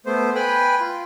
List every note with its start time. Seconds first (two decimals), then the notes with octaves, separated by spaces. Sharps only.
0.06 A3 B3 C5
0.35 B4 G5 G#5 B5
0.80 F4